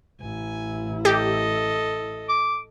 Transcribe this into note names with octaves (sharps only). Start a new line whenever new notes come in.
A1 E4 G#5
G4 A4 D#5
D6